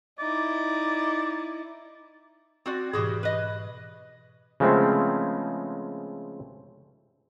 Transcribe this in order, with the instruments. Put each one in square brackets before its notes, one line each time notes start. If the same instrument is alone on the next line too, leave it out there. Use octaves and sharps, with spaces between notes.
[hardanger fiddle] D#4 E4 [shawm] D5
[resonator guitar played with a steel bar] C4 F#4 D5
[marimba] G#2 B2 E3 [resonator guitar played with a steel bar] G3 F#4 G#4
[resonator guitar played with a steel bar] B4 D#5
[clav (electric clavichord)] C#3 F3 G#3 A3 B3 C4